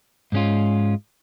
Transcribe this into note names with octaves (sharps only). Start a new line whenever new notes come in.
G#2 G#3 C#4 F4